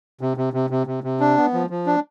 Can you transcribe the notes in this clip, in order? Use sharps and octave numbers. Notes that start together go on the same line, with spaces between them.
C3
C3
C3
C3
C3
C3
D4
B3
F3
F3
D4